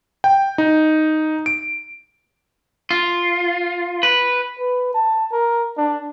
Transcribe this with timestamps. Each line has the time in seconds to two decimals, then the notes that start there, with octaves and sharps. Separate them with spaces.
0.24 G5
0.58 D#4
1.46 D7
2.91 F4
4.03 B4
4.59 B4
4.94 A5
5.32 A#4
5.77 D4